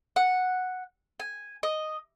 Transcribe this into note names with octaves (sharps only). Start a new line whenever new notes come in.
F#5
G#5
D#5